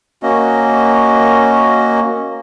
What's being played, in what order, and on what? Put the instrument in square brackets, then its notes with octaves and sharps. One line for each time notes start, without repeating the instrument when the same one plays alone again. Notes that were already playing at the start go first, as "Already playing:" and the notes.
[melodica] A#3 C#4 F#4 D#5